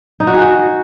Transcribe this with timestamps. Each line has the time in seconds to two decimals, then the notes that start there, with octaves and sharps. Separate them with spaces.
0.20 D#4
0.27 F#4
0.34 G#4
0.41 F#4